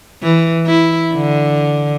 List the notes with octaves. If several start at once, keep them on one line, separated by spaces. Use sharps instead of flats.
E3
E4
D3